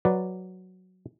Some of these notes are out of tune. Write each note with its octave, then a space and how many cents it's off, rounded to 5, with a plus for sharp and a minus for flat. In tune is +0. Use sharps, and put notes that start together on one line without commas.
F#3 +0 B4 +0 D5 +0